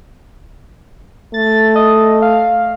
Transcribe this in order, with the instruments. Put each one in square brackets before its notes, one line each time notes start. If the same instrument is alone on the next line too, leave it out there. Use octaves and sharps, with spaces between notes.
[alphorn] A3 [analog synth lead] A6
[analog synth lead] D#5
F5